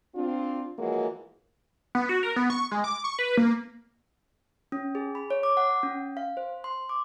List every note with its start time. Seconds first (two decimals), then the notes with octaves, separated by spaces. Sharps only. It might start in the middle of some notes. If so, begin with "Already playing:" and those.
0.15 C4 D4 F4
0.78 E3 F3 G#3 A#3 F#4 C#5
1.95 B3
2.09 F#4
2.23 A#4
2.36 B3
2.50 C#6
2.71 G#3
2.84 D6
3.04 C#6
3.19 B4
3.37 A#3
4.72 C#4
4.95 G#4
5.15 B5
5.30 C#5
5.43 D6
5.57 F#5
5.83 C#4
6.17 F5
6.37 C5
6.64 C6
6.89 D6